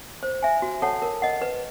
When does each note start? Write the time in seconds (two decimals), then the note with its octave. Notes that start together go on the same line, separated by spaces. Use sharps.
0.23 C5
0.43 E5 G#5
0.62 F#4
0.82 A4 C#5 F#5 A5
1.02 A#4
1.22 D#5 F#5
1.42 B4